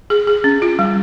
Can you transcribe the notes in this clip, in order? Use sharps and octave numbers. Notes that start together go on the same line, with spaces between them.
G#4
G#4
C#4
F4
G3